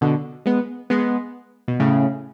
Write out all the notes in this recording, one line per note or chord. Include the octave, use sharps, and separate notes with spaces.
B2 D3
G#3 B3
G#3 B3
B2
A2 C#3